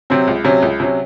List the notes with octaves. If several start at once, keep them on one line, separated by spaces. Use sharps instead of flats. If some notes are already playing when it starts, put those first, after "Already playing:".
C3 F#3 C4
C#2
C3 F#3 C#4
C#2
C3 F#3 C#4